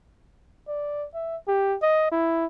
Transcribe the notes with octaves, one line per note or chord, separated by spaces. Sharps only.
D5
E5
G4
D#5
E4